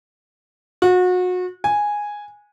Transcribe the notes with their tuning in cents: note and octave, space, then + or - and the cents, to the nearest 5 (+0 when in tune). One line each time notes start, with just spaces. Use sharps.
F#4 -30
G#5 -5